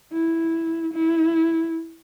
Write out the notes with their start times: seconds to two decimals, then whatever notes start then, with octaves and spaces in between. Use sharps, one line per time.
0.13 E4
0.94 E4